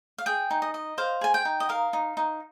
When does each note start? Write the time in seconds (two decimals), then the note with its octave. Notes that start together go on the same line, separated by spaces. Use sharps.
0.18 F5
0.26 G#4 G5
0.51 D#4
0.62 D#5
0.74 D#5
0.98 C5 F5
1.21 G#4 G#5
1.34 G5
1.45 D#4
1.60 D#5
1.69 A#4 F5
1.93 D#4
2.17 D#4